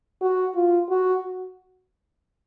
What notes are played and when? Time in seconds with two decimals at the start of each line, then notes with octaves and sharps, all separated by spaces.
0.21 F#4
0.55 F4
0.89 F#4